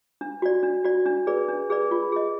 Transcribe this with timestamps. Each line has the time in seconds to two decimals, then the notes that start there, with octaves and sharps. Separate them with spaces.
0.21 D4
0.42 F#4 D5
0.63 D4
0.84 F#4 D5
1.06 D4
1.27 G#4 B4 D5
1.49 D4
1.70 G#4 B4 D5
1.91 F4
2.12 G#4 D#5